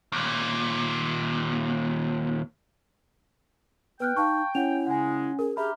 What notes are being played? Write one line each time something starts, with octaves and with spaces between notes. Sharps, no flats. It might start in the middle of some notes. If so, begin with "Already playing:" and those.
D#2 A#2
B3 B4 G5 F6 F#6
D#4 F5 A5 C#6
C#4 E4 C#5 F#5 F7
C#3 G#3 F#5 G#5
G#4 A#4
D4 G4 G#4 E5 A#5 B5 F6